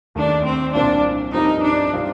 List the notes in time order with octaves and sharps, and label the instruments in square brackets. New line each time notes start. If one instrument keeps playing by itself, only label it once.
[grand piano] D#2 D#3 A3 [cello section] D4
[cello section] C4
[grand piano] C2 A#2 F3 C4 F4 [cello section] D4
[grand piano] G2 F3 C4 G4 A#4 [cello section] D#4
[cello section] D4
[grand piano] C3 G3 C4 F4